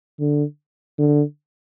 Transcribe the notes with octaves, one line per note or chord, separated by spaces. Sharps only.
D3
D3